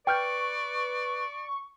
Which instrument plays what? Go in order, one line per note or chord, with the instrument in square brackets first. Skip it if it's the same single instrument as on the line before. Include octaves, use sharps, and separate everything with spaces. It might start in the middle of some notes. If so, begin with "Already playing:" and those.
[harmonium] B4 [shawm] D5 [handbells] G5 F6 G6 [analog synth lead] C#6